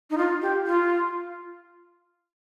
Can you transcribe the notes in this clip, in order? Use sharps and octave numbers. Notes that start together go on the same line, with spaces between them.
D#4
F4
G4
F4